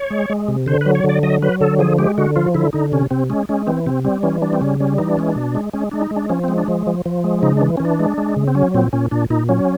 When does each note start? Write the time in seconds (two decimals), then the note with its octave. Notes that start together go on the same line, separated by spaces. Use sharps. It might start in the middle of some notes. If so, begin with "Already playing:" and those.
Already playing: C#5
0.10 G#3
0.30 G#3
0.48 C3
0.66 D3 C5
0.81 F#3 B4
0.95 C#5
1.04 D3 D5
1.23 F#3 D#5
1.42 F#3 B4
1.61 D3 A4
1.79 F3 G#4
1.98 G#3 G4
2.18 D3 F#4
2.36 F3 F4
2.54 D3 E4
2.73 D3 D#4
2.92 C3 C#4
3.11 C3 C4
3.30 G#3 C#4
3.49 G#3 C#4
3.67 E3 C4
3.86 C3 C4
4.05 G3 C4
4.23 E3 C#4
4.42 G3 D4
4.53 C4
4.61 C#3 C#4
4.80 G3 C#4
4.98 E3 D#4
5.09 D4
5.17 G#3 C#4
5.30 D4
5.36 B2
5.55 G#3
5.73 G#3 C#4
5.91 G#3 D4
6.01 D#4
6.11 G#3
6.16 D4
6.29 F3 C#4
6.44 G#3 C4
6.58 D4
6.68 F3
6.87 F3
7.06 F3
7.24 G#3
7.43 C#3 D#4
7.57 E3 D4
7.77 C#4
7.80 E3
7.85 D4
7.99 G#3
8.18 G#3
8.36 C#3
8.48 C4
8.55 F#3 C#4
8.74 A#2 C4
8.93 A#2 C#4
9.11 A#2 D4
9.30 A#2 D#4
9.49 F#3 C#4